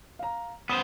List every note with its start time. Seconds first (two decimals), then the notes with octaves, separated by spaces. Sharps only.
0.19 F5 A#5
0.69 B3 C5 D#6